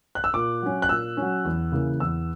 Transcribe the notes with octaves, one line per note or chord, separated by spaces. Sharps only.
F#6
E6
A#2 D6
F#3 C#4
F#6
A#2 E6
F#3 C#4
E2
C#3 E3 A#3
E2 E6